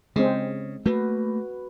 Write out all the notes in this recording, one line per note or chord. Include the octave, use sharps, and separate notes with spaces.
C#3 G#3 C4
A3 A#3 F#4 B4